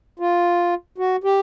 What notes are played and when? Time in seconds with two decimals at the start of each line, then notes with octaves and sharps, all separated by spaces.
0.19 F4
0.98 F#4
1.24 G4